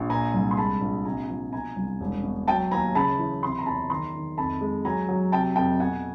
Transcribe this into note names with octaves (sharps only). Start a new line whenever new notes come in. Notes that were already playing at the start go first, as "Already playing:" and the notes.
Already playing: A#1
A#2 G#5 A#5
C2
C6
G#3 A5 B5
A#1
C3 G#5 A#5
F3
B2 G#5 A#5
C2
E1
B2
F#3 G5 A5
D#2 G#5 A#5
C#3 A5 B5
E3
C3 C6
B5
A#5
E2 A5 B5
D#3 A#5 C6
D#3
F2 A5 B5
G#3
F#3 G#5 A#5
F#3
C3 G5 A5
F2 G5 A5
B2 F#5 G#5